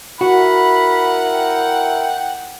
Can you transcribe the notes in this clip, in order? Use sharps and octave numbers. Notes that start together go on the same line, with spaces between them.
E4 F#4 A#4 F#5 B5
G5